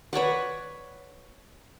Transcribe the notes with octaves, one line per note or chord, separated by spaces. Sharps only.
B4 C#5 D5 F#5